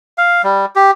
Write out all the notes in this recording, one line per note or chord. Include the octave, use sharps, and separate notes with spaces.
F5
G3
G4